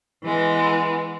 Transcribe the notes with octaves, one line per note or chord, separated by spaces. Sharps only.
E3 G#3 B3